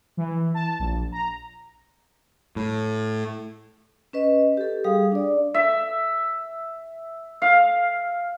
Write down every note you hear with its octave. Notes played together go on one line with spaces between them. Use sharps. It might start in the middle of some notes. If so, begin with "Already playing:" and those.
E3
A5
A#1
A#5
A2
C#4 B4 D#5
G4 A4
G3 G#4 F5 D#6
D4 D5
E5
F5